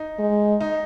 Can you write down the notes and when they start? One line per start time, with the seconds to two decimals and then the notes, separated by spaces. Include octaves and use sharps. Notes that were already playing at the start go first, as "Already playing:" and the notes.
Already playing: D#4
0.19 G#3
0.61 D#4